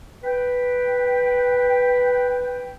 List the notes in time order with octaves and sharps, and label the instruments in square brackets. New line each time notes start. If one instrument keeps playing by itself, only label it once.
[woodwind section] B4 G5